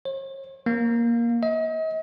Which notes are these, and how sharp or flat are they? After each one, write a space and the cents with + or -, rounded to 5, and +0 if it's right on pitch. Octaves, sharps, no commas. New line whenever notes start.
C#5 -45
A#3 +10
D#5 +40